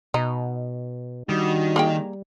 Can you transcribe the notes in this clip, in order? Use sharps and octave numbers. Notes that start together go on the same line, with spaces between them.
B2 D#4
D#3 G3 D4 F#4
A#3 G#4 G5